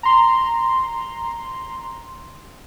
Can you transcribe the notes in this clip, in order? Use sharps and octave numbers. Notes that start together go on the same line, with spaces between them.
A#5 C6